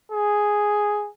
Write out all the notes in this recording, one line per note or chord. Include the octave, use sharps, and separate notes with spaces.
G#4